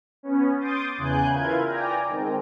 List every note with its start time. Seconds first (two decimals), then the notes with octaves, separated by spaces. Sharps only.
0.23 B3 C#4
0.60 C6 D6 D#6 G6 A6
0.97 E2 C#3 G#5 F#6 G6
1.32 E4 F4 A#4 B4 F5 G#6
1.66 D5 G5 G#5 A#5
2.08 D#3 G#3 C4